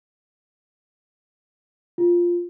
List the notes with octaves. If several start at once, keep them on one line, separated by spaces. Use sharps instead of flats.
F4